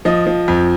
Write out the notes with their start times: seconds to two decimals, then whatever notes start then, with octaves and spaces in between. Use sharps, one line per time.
0.05 F3 D#5
0.27 F3
0.48 F2